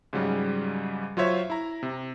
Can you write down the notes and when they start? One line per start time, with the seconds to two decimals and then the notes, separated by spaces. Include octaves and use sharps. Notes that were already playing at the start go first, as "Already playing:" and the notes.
0.13 G#2 C#3 F#3 G3
1.17 F#3 F4 C5 C#5 E5
1.50 E4 A#5
1.83 C3